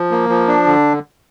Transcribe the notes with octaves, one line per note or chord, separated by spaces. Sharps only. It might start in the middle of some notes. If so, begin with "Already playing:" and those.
Already playing: F3
A#3
F3
D4
D3